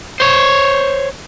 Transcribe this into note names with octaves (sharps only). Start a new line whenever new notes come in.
C5 C#5